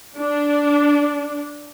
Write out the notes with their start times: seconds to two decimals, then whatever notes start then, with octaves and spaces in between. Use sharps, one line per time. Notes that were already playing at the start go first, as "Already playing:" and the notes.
0.17 D4